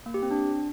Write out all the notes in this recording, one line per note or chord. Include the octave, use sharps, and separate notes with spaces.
A#3
G4
C4
D4